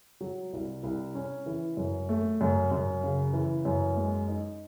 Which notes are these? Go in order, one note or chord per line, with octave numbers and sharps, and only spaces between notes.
F#3
C2
C2
C#4
E3
F#2
A3
F#2
F#2
C#3
E3
F#2
G#3
D#4